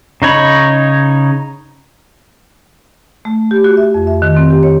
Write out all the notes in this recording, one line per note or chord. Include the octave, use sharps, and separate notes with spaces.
C#3 D#4 C#5 B5
A3
G4
F#4
E5
F2
E5
D#3
C4
G4
C#5